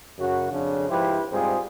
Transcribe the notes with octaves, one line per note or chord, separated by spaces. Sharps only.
F#2 C#3 F#4
F2 C#3 D4
G#2 F3 E4 G4 B4 C5
G#2 G3 C4 F4 G#4